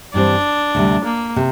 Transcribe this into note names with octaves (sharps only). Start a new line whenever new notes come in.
G2 E3 G3 C4 D4
D2 C3 G3
A#3
C3